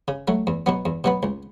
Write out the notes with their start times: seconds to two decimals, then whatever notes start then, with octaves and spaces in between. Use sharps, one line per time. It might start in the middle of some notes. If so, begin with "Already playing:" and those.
0.08 C#3
0.28 F#3 A3
0.47 E2
0.66 B2 F#3 B3
0.85 E2
1.04 B2 F#3 B3
1.23 C#2